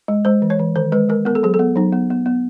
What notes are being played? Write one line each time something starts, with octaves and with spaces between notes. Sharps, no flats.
G#3
G#3 C5
E3
C#5
E3
D#3 C5
G#3 B4
G#3 A#4
B3 A#4
A4
F#3 G#4
A4
B3
F#3 D#4
B3
B3
B3